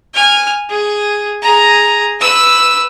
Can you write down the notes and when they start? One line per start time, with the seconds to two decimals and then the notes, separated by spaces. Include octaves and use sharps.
0.14 G#5 F6
0.70 G#4
1.43 G#4 A#5
2.20 B4 E6